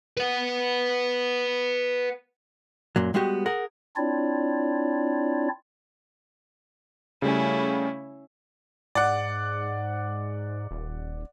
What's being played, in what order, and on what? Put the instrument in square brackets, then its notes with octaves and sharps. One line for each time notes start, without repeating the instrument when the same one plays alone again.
[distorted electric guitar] B4 F#5
[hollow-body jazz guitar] F#2 A#2 F#3
G3 G#3 B3 F#4 G4
G#4 A#4 F#5
[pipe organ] C4 D4 E4 F4 C#5 D5
[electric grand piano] C#3 G3 A3 [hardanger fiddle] C#4 E4
[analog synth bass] G#2 [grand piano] D5 F#5
[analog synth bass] D#1